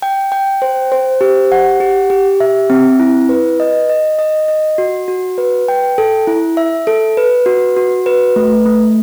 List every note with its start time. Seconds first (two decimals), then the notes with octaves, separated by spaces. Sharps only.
0.02 G5
0.32 G5
0.62 C5
0.92 C5
1.21 G4
1.52 F#5
1.80 G4
2.10 G4
2.40 E5
2.70 C4
3.00 E4
3.29 B4
3.60 D#5
3.89 D#5
4.19 D#5
4.48 D#5
4.78 F#4
5.08 F#4
5.38 B4
5.68 G5
5.98 A4
6.27 E4
6.57 E5
6.87 A4
7.17 B4
7.46 F#4
7.76 F#4
8.06 B4
8.36 A3
8.66 A3